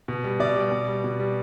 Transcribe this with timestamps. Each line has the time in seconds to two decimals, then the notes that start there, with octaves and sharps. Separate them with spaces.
0.08 B2
0.24 G3
0.40 B2 D5
0.56 G3
0.71 B2
0.88 G3
1.04 B2
1.20 G3